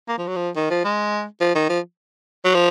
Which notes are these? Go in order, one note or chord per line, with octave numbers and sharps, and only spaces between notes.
A#3
F3
F#3
F3
D#3
F3
G#3
F3
D#3
F3
F#3
F3